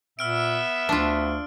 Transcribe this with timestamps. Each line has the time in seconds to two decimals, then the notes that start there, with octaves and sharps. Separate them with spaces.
0.19 A#2 B3 E5 E6 F6 D7
0.89 D2 D4 F4